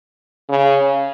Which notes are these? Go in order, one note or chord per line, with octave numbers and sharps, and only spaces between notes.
C#3